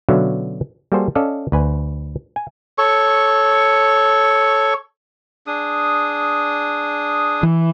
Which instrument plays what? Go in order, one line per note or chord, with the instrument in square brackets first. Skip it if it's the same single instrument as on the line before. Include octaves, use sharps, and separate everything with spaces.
[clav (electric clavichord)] B2 D3 F#3 C#4 E5 F5
G3 A#3 F#4 G#4 A4 C5
C#4 A4 D5 D#5 F5
D2 B4 G#5
G#5
[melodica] A4 C#5 C#6
D4 G#4 D#6
[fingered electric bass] E3